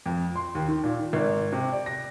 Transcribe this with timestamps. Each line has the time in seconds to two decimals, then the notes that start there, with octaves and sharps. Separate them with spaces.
0.06 F2
0.36 C6
0.55 D#2
0.68 D#3
0.84 A#2
0.99 D#3
1.13 G#1
1.52 C3
1.72 D5
1.86 A#6